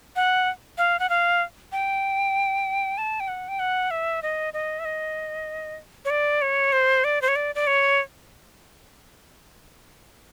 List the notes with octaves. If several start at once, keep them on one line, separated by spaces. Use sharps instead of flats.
F#5
F5
F#5
F5
G5
A5
G5
F#5
G5
F#5
E5
D#5
D#5
E5
D#5
C#5
D5
C#5
C5
D5
C5
C#5
D5
D5
C#5